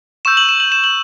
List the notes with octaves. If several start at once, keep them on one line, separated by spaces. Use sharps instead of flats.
C#6 E6 G6 E7
F#7
E7
F#7
E7
F#7